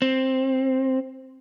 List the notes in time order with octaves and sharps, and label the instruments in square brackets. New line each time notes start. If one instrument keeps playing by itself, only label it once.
[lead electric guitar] C4